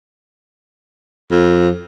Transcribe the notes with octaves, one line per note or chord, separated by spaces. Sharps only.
F2